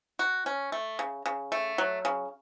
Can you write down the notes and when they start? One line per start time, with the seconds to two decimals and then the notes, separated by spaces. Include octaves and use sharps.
0.19 F#4
0.46 C#4
0.72 A3
0.99 C#3
1.26 C#3
1.52 A3
1.78 F#3
2.05 C#3